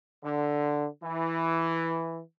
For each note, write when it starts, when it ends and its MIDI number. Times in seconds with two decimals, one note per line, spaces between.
0.24 0.86 50
1.03 2.22 52